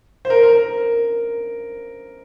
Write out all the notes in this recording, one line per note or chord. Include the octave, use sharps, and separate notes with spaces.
C5
A#4
A#4
A#4